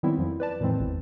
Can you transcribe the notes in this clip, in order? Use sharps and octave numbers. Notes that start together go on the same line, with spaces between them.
D#3 F#3 G3 B3 C4 E4
F2 F3
B4 D5 A5
F2 A2 D#3 E3 G#3 C4
G#1 E2